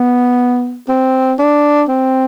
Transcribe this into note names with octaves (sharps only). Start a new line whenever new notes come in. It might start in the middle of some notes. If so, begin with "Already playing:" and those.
Already playing: B3
C4
D4
C4